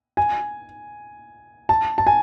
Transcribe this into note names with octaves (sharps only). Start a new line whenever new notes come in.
G#5
A5
A5
G#5